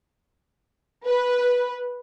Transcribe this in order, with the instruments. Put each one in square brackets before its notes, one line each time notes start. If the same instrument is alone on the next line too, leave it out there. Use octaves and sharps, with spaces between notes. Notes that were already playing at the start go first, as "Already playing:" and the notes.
[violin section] B4